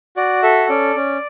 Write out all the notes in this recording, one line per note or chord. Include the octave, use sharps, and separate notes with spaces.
F#4 D5
A4 E5
C#4 D5
C#4